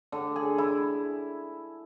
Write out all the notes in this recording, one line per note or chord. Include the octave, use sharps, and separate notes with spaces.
D3
G#4
E4